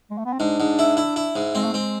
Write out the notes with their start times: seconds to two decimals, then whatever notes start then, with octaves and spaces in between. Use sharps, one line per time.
0.11 G#3
0.18 A3
0.26 B3
0.33 C4
0.39 G#2 D4
0.60 G#2
0.79 E4
0.97 E4
1.16 E4
1.36 G#2
1.55 G#3 C4
1.64 A3
1.73 G#3 C4